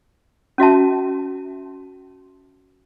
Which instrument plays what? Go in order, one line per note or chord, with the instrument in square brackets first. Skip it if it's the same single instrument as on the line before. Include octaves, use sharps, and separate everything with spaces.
[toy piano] C#4 F#4 E5 A5